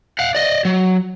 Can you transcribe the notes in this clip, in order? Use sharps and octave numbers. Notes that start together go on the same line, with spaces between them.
F5 F#5
D5 D#5
F#3